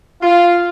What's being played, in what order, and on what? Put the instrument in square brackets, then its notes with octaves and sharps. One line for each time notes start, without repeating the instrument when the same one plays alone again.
[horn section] F4